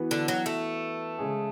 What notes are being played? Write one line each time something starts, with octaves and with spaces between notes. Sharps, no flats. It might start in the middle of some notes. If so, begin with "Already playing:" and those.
Already playing: E3 B3 F#4 B4
D3
F#3
A3
C#3 G#3 C#4 G#4